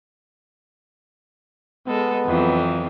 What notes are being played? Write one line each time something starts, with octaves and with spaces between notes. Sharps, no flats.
G#3 B3 A4
F2 E3 F#3